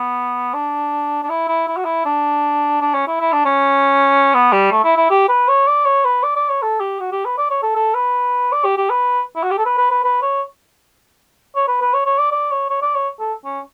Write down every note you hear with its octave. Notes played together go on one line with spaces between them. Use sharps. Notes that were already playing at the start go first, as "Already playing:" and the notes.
Already playing: B3
D4
D4
E4
E4
E4
F#4
E4
D4
D4
C#4
E4
E4
D4
C#4
B3
G3
A3
E4
E4
G4
B4
C#5
D5
C#5
B4
D5
D5
C#5
A4
G4
F#4
G4
B4
D5
C#5
A4
A4
B4
D5
G4
G4
B4
E4
F#4
G4
A4
B4
B4
B4
B4
C#5
C#5
B4
B4
C#5
C#5
D5
D5
C#5
C#5
D5
C#5
A4
C#4